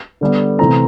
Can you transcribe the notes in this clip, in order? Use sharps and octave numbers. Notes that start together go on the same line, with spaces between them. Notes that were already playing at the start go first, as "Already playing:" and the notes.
D3 G3 B3
C3 E3 A3 C4 A#5